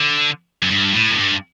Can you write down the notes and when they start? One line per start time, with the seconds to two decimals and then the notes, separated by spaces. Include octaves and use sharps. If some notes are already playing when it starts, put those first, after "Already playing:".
Already playing: D3
0.62 F#2
0.71 G2
0.93 A2
1.11 F#2
1.15 G2